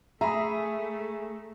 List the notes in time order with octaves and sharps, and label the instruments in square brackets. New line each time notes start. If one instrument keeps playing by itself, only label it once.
[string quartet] A3 [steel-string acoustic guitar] G#4 [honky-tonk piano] E5 B5 D#6 [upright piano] A#5